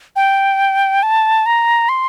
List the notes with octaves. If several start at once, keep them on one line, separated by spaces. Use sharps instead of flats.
G5
A5
A#5
C6